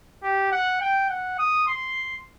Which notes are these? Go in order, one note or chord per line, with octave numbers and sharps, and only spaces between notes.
G4
F#5
G5
F#5
D#6
C6